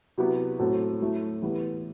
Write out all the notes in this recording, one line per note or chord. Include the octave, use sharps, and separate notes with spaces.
C3 F#3 B3 E4 G4
A2 F#3 C4 F#4 A4
F#3 A3 E4
E3 B3 E4 G4